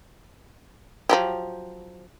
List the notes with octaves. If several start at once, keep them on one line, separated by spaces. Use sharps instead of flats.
F3 F#3 G4